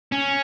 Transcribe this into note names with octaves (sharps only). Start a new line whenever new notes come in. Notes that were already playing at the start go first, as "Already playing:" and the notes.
C#4